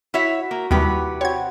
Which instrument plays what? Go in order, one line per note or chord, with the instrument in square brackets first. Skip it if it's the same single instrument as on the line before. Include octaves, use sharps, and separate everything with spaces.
[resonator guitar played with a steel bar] E4 C#5 E5 [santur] F#4
[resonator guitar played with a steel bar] A#3
[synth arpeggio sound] D#2 G3 [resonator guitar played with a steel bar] C3 G4 [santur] E4 B4 F#5
[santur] C4 F#4 [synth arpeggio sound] C#5 G#6